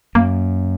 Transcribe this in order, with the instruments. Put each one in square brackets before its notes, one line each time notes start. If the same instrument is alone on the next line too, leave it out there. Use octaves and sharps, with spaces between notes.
[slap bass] F#2 [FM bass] A#3